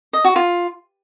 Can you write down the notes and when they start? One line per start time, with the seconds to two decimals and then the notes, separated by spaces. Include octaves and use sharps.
0.13 D#5
0.24 F#4
0.36 F4